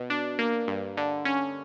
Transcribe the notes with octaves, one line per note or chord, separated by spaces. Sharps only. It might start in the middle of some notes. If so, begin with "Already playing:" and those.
Already playing: B2
D4
A#3
G2
D3
C#4